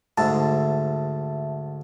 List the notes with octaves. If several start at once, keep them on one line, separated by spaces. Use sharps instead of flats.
D2 G#2 E5 A5